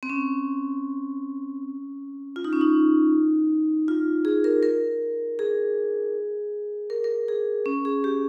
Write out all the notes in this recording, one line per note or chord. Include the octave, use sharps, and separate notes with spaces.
C4
C#4
F4
D#4
C#4
D#4
F4
G#4
A#4
A#4
G#4
A#4
A#4
G#4
C#4
G#4
G4